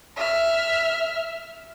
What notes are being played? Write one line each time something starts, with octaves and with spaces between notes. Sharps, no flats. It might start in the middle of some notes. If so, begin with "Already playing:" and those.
E5 F6